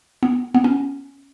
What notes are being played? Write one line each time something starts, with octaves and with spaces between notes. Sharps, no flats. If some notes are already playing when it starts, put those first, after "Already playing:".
B3
B3
C#4